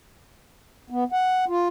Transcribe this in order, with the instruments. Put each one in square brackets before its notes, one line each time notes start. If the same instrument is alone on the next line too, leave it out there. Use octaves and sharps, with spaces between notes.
[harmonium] B3
F#5
F4